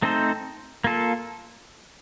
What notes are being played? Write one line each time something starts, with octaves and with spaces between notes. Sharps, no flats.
A3 C4 D#4 A4 C5
A#3 F4 A4